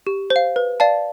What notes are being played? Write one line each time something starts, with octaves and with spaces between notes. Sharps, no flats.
G4
C5
F5
B4
D5 F5 A5